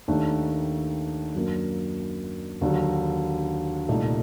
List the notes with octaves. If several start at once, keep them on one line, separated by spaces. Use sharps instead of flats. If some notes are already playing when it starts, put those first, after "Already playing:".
D#2 D#3 A3 D4
F#2 F#3 A#3 D4
D#2 D3 F#3
C2 A#2 A3 D#4